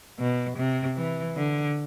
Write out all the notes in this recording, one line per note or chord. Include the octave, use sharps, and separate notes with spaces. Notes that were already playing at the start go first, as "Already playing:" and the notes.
B2
C3
E3
D3